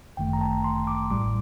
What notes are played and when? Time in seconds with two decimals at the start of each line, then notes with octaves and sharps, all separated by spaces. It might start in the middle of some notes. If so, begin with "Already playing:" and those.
0.17 G1 F#2 D#3 A3 G5
0.33 A#5
0.41 A5
0.64 C6
0.87 D6
1.11 A1 A2 G3 D6